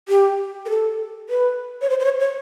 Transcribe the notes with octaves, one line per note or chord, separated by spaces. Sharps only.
G4
A#4
A4
B4
C#5
C5
C5
C#5
C#5